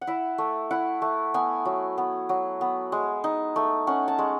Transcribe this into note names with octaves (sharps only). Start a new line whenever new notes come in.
F#5
E4 E5
A3
E4 F#5
A3
B3 G#5
F#3
B3
F#3
B3
G#3
D#4
A3
C#4 F#5
A5
G#3